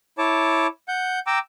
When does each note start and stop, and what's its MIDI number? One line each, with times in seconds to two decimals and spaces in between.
0.18 0.67 64
0.18 0.67 73
0.18 0.67 81
0.18 0.67 86
0.88 1.19 78
0.88 1.19 91
1.27 1.39 79
1.27 1.39 82
1.27 1.39 86
1.27 1.39 88